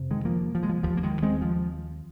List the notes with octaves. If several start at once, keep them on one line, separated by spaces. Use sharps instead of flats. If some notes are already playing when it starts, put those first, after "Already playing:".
Already playing: F2 C3
D#3 G#3
F3 A#3
F3
G#3
F3
D#2 F3
A#3
D#3 G#3
G#3 C4
F3